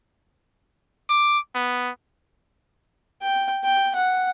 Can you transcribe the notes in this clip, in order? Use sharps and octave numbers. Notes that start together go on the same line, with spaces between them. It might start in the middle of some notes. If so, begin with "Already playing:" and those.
D6
B3
G5
G5
F#5